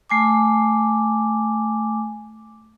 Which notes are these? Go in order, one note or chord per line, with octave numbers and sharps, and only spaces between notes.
A3 G#5 D6